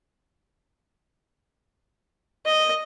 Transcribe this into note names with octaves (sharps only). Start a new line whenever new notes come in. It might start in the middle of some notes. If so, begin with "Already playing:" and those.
D#5